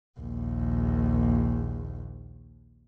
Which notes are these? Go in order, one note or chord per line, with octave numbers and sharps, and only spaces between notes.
A#1 D#2